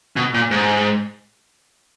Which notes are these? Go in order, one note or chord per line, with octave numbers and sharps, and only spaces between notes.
B2
A#2
G#2